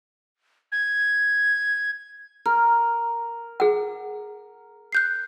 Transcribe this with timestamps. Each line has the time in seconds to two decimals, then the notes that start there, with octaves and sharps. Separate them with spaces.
0.72 G#6
2.46 A#4 F6
3.60 G#4 F#5
4.92 F#6 G6 C7